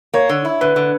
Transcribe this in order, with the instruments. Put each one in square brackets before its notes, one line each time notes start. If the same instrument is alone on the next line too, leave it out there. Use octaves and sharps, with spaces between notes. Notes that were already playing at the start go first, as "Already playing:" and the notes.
[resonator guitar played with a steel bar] A#3 [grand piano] C#5
[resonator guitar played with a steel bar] D3
E4
[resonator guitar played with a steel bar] D3 [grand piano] B4
[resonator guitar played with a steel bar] D3